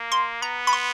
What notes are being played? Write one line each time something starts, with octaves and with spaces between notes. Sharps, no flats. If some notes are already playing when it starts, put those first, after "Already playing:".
Already playing: A#3
C6
B3 A#5
B5
C6